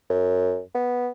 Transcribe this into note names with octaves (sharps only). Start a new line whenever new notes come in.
F#2
B3